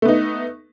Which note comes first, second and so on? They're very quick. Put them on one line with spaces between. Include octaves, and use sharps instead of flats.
A3 B3 D#4